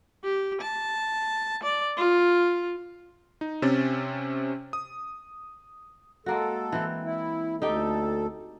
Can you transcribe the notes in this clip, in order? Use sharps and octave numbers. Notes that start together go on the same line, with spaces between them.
G4
A5
D5
F4
D#4
C3 C4 C#4 A6
D#6
G#3 A#3 F#4 A4
E3 C4
E4
D2 D#4 G4 A4 G5